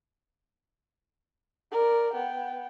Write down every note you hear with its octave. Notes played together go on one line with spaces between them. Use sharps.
A#4 D5
B3 G5